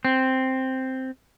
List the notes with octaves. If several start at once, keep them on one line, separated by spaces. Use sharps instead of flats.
C4